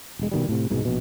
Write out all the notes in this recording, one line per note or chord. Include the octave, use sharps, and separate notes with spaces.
E1 G#3
B2 D#3 G3
A2 C3
C2 G#2 B2 G#3
A#1 B2